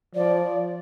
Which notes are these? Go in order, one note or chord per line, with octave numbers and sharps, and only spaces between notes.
F3 D5